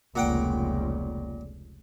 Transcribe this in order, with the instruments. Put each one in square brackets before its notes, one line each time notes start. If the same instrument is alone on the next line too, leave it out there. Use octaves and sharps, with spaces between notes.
[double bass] F1 C#2 [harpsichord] A#2 F#5 G5